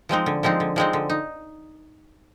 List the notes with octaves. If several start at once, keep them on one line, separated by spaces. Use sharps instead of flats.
F3 G#3 C4 D#4
D3
F3 G#3 C4 D#4
D3
F3 G#3 C4 D#4
D3
D#4